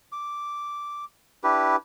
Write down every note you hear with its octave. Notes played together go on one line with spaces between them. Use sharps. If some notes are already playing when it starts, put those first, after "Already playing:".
D6
D4 E4 G4 B4